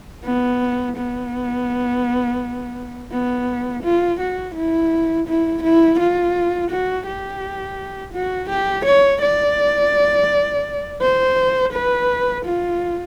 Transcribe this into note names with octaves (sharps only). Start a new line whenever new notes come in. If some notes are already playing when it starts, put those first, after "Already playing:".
B3
B3
B3
F4
F#4
E4
E4
E4
F4
F#4
G4
F#4
G4
C#5
D5
C5
B4
F4